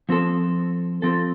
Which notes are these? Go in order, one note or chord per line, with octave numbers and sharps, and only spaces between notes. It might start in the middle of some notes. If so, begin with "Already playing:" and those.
F3 C4 A4
F3 C4 A4